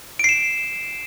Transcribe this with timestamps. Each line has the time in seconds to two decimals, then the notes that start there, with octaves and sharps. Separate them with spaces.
0.19 D7
0.24 C7
0.29 E7